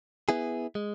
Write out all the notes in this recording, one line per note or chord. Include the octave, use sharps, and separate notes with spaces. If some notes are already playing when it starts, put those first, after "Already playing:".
B3 E4 G#4
G#3